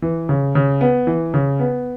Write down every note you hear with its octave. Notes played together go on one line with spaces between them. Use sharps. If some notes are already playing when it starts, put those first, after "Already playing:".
E3
C#3
C#3
B3
E3
C#3
B3